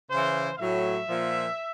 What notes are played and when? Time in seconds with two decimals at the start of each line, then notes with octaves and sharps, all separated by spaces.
0.10 C#3 E3 C5
0.59 A2 F#3 E5
1.08 A#2 F3